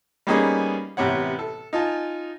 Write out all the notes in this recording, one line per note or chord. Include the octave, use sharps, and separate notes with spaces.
G3 A#3 B3 C#4 D#4 G#4
A1 C3 B3 C#5 F#5
A4
D#4 F4 G#5 A5